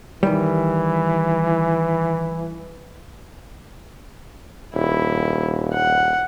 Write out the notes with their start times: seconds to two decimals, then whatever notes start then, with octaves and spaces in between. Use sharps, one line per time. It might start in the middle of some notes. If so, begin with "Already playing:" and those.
0.23 D#3 E3 G3
4.75 D#1 E4
5.73 F#5